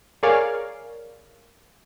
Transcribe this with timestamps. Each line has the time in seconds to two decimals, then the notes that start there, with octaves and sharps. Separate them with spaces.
0.23 G#4 A#4 C#5 D5 F5 G#5